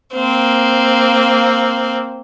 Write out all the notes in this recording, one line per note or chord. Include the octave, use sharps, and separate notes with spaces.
A#3 C4